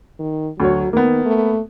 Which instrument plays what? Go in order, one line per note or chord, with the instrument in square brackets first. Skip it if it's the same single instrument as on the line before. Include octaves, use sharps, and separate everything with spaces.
[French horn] D#3
[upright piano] D2 C#5 [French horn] F#3
[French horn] D#3 [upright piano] A#3 B3
[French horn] A3